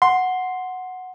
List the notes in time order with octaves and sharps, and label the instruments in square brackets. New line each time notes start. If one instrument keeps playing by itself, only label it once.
[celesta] F#5 [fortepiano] C6